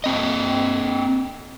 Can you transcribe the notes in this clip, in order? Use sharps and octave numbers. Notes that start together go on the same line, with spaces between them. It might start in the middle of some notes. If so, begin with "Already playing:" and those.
A#3 C4 D#5